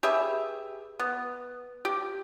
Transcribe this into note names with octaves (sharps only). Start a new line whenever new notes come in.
G4 G#4 B4 E5
B3
G4